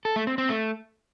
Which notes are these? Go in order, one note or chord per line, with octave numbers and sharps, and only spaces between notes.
A4
A3
C4
C4
A3